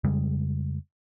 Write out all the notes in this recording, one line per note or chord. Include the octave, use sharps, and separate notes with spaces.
F2 C#3 G3 G#3